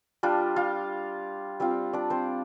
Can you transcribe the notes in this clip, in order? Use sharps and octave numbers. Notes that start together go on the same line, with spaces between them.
G3 D4 F4
F4 F5
G3 C4 F4
D4 D5
C4 C5